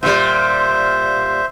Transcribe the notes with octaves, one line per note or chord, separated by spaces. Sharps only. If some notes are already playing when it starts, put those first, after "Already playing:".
A#2 G3 C5 E5